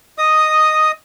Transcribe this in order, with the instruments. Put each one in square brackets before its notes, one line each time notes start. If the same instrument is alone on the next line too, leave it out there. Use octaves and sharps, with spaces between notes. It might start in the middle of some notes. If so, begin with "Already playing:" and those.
[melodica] D#5 D#6